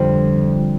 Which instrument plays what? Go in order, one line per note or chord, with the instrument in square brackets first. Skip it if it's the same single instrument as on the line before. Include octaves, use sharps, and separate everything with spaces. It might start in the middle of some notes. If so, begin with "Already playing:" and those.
Already playing: [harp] F2 D3 G3